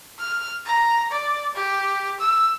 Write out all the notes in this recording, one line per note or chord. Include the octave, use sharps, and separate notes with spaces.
F6
A#5
D5
G4
E6